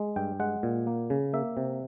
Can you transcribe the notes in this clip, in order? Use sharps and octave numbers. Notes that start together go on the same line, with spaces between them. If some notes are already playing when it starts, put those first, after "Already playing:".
Already playing: G#3
G2 G5
G#3 F#5
A#2
A#3
C#3
A#3 E5
C3